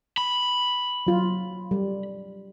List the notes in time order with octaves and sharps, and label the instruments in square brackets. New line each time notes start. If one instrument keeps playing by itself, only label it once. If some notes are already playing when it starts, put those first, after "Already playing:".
[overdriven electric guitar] B5
[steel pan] F#3 F4
G3